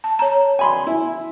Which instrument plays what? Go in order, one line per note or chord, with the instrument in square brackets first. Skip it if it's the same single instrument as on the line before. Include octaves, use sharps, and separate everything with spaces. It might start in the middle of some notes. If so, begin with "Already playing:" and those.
[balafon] A5
C#5 A#5
[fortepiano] G#5 B5 C6
E4